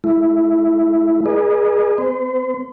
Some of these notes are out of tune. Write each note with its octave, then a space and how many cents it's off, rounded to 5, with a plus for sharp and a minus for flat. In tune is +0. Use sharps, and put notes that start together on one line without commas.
A3 -40 E4 +0
G#4 +0 B4 -45 D#5 -35
C4 -30 C5 -40